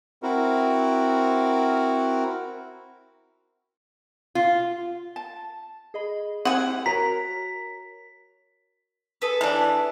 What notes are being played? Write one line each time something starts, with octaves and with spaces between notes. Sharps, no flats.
C4 E4 F#4 A#4
F4
A5
G#4 D#5 B5
C4 E4 G4 C5 F#5 G#5
F#4 A#4 C#5 A#5 B6
G#4 A4 B4
E3 D4